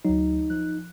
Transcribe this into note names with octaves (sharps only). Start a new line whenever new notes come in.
D2 F#3 D#4
F3 F#6